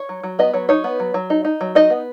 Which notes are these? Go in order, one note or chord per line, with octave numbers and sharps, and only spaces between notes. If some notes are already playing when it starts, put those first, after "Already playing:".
Already playing: C#5
F#3
F#3
B3 D#5
F#3 C#5
D#4 C#5
B3
F#3
F#3
D#4
D#4
F#3
D#4 D#5
B3